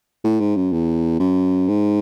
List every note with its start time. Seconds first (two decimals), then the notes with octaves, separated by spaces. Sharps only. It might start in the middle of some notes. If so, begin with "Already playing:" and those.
0.24 A2
0.40 G#2
0.56 F#2
0.73 E2
1.20 F#2
1.68 G#2